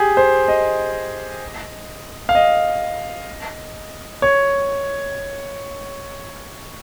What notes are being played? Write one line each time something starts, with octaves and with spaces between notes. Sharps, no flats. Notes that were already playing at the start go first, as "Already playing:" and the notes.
Already playing: G4 G#4
C5
D#5
F5
D#5
C#5